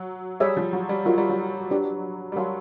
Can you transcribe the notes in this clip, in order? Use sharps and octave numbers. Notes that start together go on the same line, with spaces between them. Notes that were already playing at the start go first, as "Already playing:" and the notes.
Already playing: F#3
G3 G#4 C#5 E5
F3
F#3
G3
F#3 F4 A#4 D#5
G3
F#3
D4 G4 B4 D5
G3
F#3 A#4 C#5 F5 A5 C6